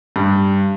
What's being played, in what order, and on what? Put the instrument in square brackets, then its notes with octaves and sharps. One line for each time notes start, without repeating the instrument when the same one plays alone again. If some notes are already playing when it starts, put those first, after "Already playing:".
[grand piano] G2